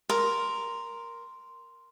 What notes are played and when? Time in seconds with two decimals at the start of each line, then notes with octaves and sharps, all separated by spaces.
0.09 A#4 C6